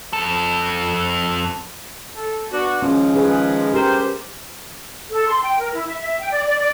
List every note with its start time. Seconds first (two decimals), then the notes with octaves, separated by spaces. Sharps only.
0.13 F2 A4
2.15 A4
2.51 B3 D4 F#4
2.82 D#3 F3 G#3 C#4
3.16 G#4 B4
3.74 G4 A#4 C5
5.10 A4
5.27 C6
5.42 G5
5.59 A#4
5.73 E4
5.86 E5
6.00 E5
6.20 G5
6.31 D5
6.46 D5
6.60 D5